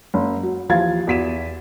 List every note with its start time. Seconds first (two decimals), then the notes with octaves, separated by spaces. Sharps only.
0.14 F#1
0.43 F#3
0.69 D#2 E3 F3 F5 G#6 A6
1.07 E2 F#4 B6 D#7 E7